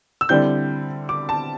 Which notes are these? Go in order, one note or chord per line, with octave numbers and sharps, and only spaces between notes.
E6
D3 G3 C4 E4 G6
D6
A5